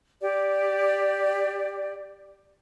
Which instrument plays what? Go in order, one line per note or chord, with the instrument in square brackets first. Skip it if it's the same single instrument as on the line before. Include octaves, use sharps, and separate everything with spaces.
[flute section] G4 D5